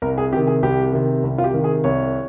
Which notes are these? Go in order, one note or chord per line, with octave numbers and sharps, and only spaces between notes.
C2 A#4
G#4
C3 D#3 G4
G#4
C2 G4
C3 D#3
C2
F4
G4
C3 D#3
G#4
C2 C#5